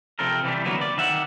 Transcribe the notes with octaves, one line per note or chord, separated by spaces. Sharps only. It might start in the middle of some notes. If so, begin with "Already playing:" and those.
C3 F3 C4 A4 A#4
C3 E3 G3
D3 F#3 A#3 B3
D5
D#3 E5 F#5